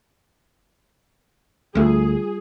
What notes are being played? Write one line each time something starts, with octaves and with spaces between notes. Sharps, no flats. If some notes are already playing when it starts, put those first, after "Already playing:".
D2 G3 A3 F4 G#4